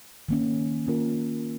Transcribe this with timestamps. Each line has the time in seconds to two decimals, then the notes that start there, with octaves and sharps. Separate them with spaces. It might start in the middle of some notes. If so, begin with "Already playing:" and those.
0.29 D#3 A#3 C#4
0.87 D#3 A#3 C#4 F4 A#4